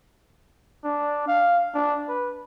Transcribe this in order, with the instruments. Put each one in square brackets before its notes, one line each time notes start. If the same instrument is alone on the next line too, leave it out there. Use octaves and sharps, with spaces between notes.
[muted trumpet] D4
F5
D4
B4